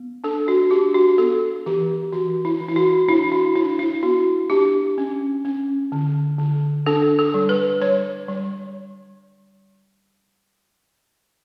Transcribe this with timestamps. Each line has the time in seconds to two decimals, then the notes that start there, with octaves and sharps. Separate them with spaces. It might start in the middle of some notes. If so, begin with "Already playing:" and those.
Already playing: B3
0.24 D4 A4
0.48 F#4
0.71 D4 G4
0.94 F#4
1.18 B3 A4
1.66 E3 G4
2.12 E3 F#4
2.45 E4
2.61 E3
2.68 E4
2.76 F#4
3.08 D4 E4
3.32 F#4
3.55 D4 E4
3.79 E4
4.03 B3 F#4
4.50 D4 G4
4.98 C#4
5.45 C#4
5.92 D3
6.39 D3
6.86 D4 A4
7.19 A4
7.34 G3
7.49 B4
7.81 G3 C#5
8.28 G3